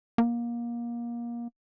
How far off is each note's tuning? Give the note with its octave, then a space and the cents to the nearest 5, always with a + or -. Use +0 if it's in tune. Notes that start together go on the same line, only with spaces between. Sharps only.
A#3 +25